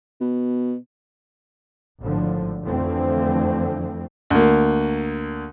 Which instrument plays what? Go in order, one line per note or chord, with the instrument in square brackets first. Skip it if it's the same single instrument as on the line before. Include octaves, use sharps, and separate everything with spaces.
[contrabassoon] B2
[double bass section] G#1 A2 D3 F3
F2 D3 E3 F3 A3 C4
[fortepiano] D2 A#3